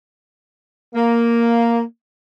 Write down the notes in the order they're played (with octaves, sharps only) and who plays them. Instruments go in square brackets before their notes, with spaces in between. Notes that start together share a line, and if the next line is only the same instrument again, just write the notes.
[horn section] A#3